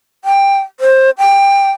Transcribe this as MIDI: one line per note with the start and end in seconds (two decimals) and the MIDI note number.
0.25 0.58 79
0.80 1.10 72
1.18 1.71 79